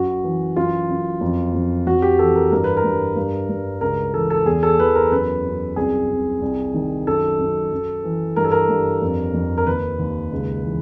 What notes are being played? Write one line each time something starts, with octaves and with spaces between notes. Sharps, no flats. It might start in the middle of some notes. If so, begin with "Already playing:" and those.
Already playing: F#2 F#4
E3
F#2 F4
F#2
F2
F2
F2 F#4
G4
E3 A4
A#4
G2 A#4
B4
A#4
G2
G2
G2
C#2 A#4
E3 A4
A4
E2 G#4
A4
E2 B4
A#4
F#2 B4
F#2
C2 G#4
C2
C2
D#3
F#2 A4
F#2
F#2
E3
G2 A#4
A4
A#4
G2
F2
F2
A#4
D#2 B4
D#2
C#2
E3